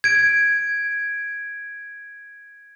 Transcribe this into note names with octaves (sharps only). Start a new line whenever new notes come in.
G#6 D7